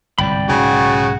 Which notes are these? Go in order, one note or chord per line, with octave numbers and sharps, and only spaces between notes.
G1 C2 G#2 D5 G5 B5
B1 G#2 C#3 F#3 F#4